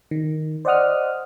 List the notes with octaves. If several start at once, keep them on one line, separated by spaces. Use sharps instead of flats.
D#3
C5 D5 D#5 F#5 D#6 F6